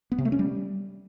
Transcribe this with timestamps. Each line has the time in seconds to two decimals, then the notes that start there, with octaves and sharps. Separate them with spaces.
0.12 B3
0.18 C3
0.25 A3
0.32 C#4
0.39 G3